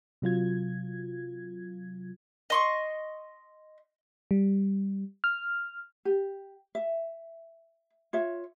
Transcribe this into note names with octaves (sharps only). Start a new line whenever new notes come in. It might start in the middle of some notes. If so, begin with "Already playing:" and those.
C3 F#3 F4 G#6
D#5 C6 C#6
G3
F6
G4
E5
F4 C#5 E5